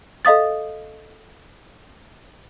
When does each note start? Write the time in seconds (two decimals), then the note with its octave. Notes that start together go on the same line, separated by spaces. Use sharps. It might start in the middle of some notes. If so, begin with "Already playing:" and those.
0.25 A4 D#5 F5 D#6 A6